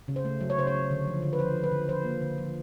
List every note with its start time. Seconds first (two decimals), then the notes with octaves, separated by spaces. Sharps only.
0.08 C#3
0.16 C5
0.25 A3
0.41 F#3
0.50 C#5
0.58 C#3 C5
0.67 C#5
0.74 F#3
0.91 D3
1.07 F3
1.22 D3
1.33 B4
1.39 F3 C5
1.56 F3
1.64 B4
1.71 D3
1.89 F3 C5
2.05 A#3
2.21 D3
2.38 F3